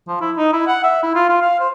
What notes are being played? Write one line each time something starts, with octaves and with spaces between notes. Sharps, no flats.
F3
E4
D#4
E4
F#5
E5
E4
F4
F4
F5
C5